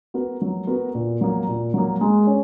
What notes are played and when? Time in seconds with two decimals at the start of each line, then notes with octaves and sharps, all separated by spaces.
0.14 B3 F#4 A#4
0.42 F#3
0.67 B3 F#4 A#4
0.95 A#2
1.21 F#3 A#3
1.48 A#2
1.74 F#3 A#3
2.01 G#3
2.27 C#4